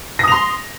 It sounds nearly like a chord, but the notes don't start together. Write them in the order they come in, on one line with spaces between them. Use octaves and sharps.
A#6 D#6 F7 C6